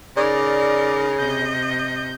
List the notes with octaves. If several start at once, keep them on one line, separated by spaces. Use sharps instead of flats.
C#3 D#4 A#4 D5
C3 D#5 G6